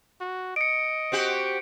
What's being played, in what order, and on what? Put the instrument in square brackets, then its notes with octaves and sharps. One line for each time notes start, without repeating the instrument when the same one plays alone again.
[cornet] F#4
[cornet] D#5 [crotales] C#7 D7
[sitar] C4 F#4 G4